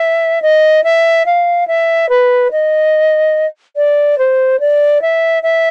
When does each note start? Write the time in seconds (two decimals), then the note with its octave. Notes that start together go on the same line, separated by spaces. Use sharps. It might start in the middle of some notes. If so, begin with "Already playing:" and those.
Already playing: E5
0.42 D#5
0.84 E5
1.26 F5
1.67 E5
2.09 B4
2.51 D#5
3.77 D5
4.18 C5
4.60 D5
5.02 E5
5.43 E5